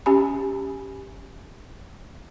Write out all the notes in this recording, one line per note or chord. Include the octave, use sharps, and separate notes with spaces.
C#4 G4 G#5 B5